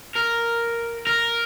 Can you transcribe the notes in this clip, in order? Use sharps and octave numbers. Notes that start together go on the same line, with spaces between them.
A#4
A#4